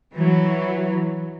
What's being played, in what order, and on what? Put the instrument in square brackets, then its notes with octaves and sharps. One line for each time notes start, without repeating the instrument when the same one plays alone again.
[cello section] E3 F#3